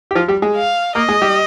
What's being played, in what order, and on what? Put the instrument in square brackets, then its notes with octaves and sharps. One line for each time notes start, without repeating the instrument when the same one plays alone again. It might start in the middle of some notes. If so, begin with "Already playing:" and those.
[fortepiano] G4
F3 F4
G3 G4
G#3 G#4
[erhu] F5
[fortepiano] A#3 A#4 [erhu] D#5
[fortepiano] G#3 G#4
G3 G4